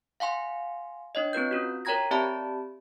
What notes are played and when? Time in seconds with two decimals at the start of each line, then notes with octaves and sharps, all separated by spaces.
0.20 F5 F#5 G#5 C6
1.15 D4 C#5 D#5
1.33 C4 F4 B4 G6
1.51 C#4 F4 F#4
1.85 A#4 C#5 G5 A#5 G#6 A#6
2.11 C4 G4 D5 E5 A5 B5